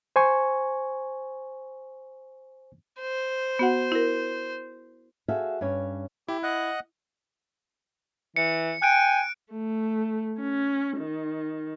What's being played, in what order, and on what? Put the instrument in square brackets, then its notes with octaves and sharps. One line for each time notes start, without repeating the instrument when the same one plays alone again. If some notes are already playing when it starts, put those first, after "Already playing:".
[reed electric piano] C5 G#5 C#6
[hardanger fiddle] C5
[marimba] B3 F#4 F#5
E4 A#4
[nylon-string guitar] F#4 G#4 A4 E5 F5
G2 C#4 C#5
[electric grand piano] E4 [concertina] G4
[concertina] D#5 F#5 F#6
[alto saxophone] E3 [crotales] C#7
[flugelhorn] G5 [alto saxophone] G#5 [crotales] F#6 D7
[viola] A3
C#4
D#3